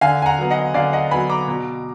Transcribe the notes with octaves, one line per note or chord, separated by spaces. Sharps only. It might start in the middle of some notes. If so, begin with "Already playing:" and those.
D3 F5 G#5
G#5
F#5 A#5
F#3 B3
D#5 F#5
D3 D5 F5
D#5 F#5
F#3 B3 G#5 B5
A#5 D6
B2